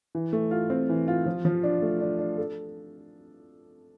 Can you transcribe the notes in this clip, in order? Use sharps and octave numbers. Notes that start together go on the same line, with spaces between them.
E3
A3
F4
C4
E3
F4
F3
F3
D4
A3
D4
D4
A4